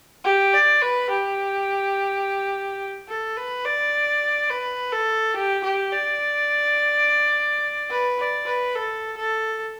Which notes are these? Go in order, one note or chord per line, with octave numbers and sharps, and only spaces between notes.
G4
D5
B4
G4
A4
B4
D5
B4
A4
G4
G4
D5
B4
D5
B4
A4
A4